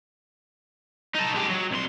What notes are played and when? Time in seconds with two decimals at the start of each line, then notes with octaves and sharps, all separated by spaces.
1.15 D#4 A4
1.35 G#3 G4
1.49 F#3
1.71 C2 C6